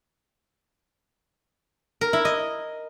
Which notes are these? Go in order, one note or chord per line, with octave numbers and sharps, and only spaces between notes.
A#4
E4
D#5